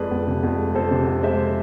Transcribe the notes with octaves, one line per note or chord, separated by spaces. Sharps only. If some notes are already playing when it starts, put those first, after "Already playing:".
Already playing: F2 G#3 B4 D5
F2
C3
F2
G#3
F2 A4 C5
C3
F2
G#3 C5 E5